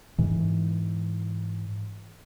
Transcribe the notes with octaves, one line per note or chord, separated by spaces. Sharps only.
G#2 E3